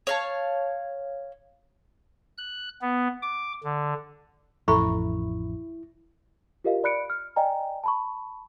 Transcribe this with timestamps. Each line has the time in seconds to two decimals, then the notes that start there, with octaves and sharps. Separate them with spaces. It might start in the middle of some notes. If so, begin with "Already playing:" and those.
0.07 C#5 F5 A5
2.38 F#6
2.81 B3
3.22 D6
3.64 D3
4.68 A1 F2 E4 A4 E5 A#5 B5 C#6
6.64 F4 G4 A#4 D#5 F5
6.84 D5 B5 F#6 C#7 D7
7.10 F6
7.36 D5 D#5 G5 G#5 A#5
7.84 A5 B5 C#6